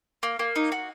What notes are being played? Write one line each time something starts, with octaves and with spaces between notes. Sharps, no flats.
A#3
A#3
D#4
F#4